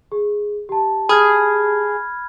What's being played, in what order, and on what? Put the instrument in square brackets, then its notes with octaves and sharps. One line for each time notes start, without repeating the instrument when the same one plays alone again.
[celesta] G#4
G4 A5
[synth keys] G#4 [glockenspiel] B5 F6 G#6